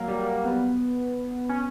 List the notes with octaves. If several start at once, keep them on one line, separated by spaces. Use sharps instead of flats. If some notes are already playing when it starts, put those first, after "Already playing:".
Already playing: F#3 A#3
G3
A#3
B3
C#4